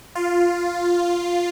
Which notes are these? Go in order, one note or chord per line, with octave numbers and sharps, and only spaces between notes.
F4